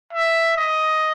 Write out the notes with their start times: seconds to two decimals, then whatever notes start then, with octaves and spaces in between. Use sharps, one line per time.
0.13 E5
0.57 D#5